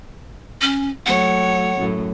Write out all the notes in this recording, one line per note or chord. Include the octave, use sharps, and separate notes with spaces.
C#4
F#3 A3 C#5 F#5
F#2 A2